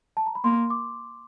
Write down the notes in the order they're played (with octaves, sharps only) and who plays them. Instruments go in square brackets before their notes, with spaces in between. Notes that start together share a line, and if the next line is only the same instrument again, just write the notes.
[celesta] A5
A#5
B5
[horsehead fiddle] A#3 [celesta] C6
[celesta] D6